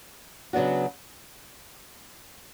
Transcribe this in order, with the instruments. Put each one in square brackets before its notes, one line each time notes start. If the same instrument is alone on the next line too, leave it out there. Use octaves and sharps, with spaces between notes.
[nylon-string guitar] C#3 F#3 B3 D4 F#4